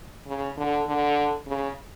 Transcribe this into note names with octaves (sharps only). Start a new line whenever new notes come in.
C#3
D3
D3
C#3